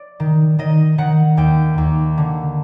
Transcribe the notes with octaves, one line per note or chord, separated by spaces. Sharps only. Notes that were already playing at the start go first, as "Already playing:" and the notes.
Already playing: D5
D#3
D#3 D#5
D#3 F#5
D#2 G5
D#2
D3